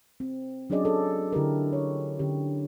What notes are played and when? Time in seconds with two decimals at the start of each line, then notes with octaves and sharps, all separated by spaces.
0.20 C4
0.70 F#3 C#4 D4 G#4 D5 D#5
0.84 D4 G#4 A4 D5
1.33 D3 E4 G4 A4 A#4
1.73 C#5
2.19 D3 C#4 G4